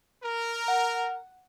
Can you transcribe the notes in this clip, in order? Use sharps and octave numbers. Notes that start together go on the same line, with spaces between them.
A#4
F#5